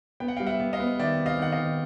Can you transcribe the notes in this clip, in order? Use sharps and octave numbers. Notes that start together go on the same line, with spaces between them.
B3 G5
F#5
F5 G5
G3
E5 F#5
B3
D#5 F5
B3
D#3 D5 E5
C3
D#5 F5
D#3 F#5
D#5 F5
D#3